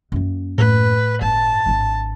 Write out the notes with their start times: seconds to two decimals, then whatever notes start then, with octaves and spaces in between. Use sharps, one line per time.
0.12 F#2 A#3
0.58 A2 A3 B4
1.22 G1 A5
1.66 G#1 D4